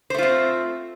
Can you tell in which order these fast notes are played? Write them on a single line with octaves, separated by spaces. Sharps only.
C5 A3 F4 C4